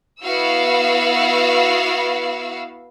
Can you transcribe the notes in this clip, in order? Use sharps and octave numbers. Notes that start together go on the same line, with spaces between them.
B3 E4 F#4 F5 E6